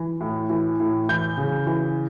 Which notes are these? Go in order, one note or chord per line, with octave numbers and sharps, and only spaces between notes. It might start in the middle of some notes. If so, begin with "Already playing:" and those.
Already playing: E3
A2
E3
A2
E3 G6
C#3
E3